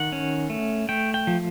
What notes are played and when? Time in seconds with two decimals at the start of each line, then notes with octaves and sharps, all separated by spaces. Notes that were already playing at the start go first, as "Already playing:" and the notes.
Already playing: D#3 F#5
0.12 C#4
0.50 A3
0.89 A3 G5
1.14 G5
1.27 F3